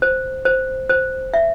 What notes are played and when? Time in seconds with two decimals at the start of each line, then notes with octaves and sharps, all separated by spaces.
0.02 C5
0.45 C5
0.89 C5
1.34 E5